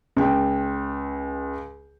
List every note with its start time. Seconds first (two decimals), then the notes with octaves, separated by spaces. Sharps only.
0.16 C#2 G5